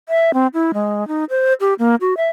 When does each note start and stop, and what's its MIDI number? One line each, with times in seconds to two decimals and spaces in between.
0.09 0.34 76
0.34 0.47 60
0.54 0.72 64
0.74 1.07 56
1.08 1.25 63
1.30 1.53 72
1.60 1.74 67
1.79 1.95 58
2.01 2.16 66
2.17 2.29 76